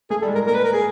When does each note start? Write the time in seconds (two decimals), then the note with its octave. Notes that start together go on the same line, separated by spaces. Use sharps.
0.10 A3 G#4
0.22 G3 A4
0.28 G#3
0.35 A#4
0.47 A#3 A#4
0.55 B4
0.64 A#4
0.73 G#4